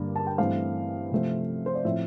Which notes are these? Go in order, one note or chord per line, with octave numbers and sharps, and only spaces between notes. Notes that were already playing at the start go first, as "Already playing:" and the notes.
Already playing: G2 D3 G3 A#3
A5
G5
G2 E3 A3 C4 F5
C3 F3 A3 C4
C5
D5
A2 F3 C4 E5